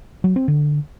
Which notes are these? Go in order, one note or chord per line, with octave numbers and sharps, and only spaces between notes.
F#3
C4
D3